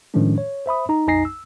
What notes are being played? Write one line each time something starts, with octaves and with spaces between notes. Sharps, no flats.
A2 D#3 F3 G#3 C#4 D4
C#5
C5 E5 B5 D#6
D#4 A#5
A#1 F2 D#4 G#5 A#6 C7
E6